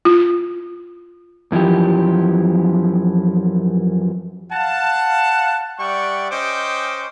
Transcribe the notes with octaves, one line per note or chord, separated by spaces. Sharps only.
F4
F#2 E3 F3 G4
F5 F#5 A5
G3 D5 E5 F#5 G5 C#6
C#4 C5 D#5 G5 C#6 D6